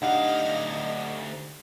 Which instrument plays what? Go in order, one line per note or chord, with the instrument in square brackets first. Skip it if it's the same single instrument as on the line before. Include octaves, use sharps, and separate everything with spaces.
[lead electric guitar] D2 F5 [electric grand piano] D4 D#4 G4 [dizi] D#5 [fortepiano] F#5